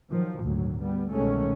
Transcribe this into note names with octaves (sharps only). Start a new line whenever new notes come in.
D#3 F3 F#3
G#1 D2 A#2 F#3
G3 B3
C2 B2 D#3 G#3 A3 C#4